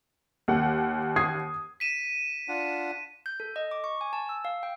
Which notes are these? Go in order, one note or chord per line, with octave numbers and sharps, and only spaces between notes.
D#2 A#3 F#5
D#6 G#6 C7
B6 D#7 E7
D4 F4 F#5
G6
A4
D#5
D6
C#6
G#5
A5
E6
F5
G5